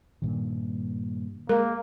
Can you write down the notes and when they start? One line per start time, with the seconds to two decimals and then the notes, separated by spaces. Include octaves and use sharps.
0.22 G2 A#2 D#3
1.49 G#3 A#3 A#4